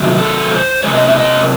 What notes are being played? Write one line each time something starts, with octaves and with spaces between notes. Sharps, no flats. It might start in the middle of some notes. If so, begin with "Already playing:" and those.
Already playing: C3 D#3 F#3 A3
A4
C5
C3 E3 G#3 C#5
D#5
E5
D#5